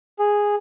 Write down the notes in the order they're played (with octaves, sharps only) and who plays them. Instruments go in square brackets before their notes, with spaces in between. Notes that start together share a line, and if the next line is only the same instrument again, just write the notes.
[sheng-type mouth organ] G#4